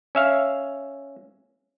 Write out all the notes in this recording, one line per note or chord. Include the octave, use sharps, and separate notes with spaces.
C#4 E5 F5